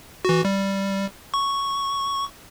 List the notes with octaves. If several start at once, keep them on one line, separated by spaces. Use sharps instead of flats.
E3 F#4
G3
C#6